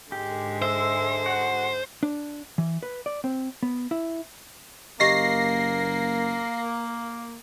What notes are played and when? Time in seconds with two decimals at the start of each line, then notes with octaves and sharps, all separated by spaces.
0.12 G#2 D3 G#3 G4
0.62 C5 E5 E6
1.26 F#4 F#5
2.03 D4
2.58 E3
2.83 B4
3.06 D5
3.24 C4
3.63 B3
3.91 E4
5.00 F#1 A#3 G4 D#5 A#6 C7